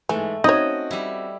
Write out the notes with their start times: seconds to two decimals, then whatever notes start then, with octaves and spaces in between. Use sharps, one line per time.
0.09 G#2 E3 A3 G#5
0.44 C4 C#4 D#4 F#4 C#5 D#5
0.91 G3 E4